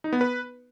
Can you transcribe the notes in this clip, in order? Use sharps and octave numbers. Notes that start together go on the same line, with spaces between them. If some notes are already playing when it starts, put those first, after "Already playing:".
D#4
B3
B4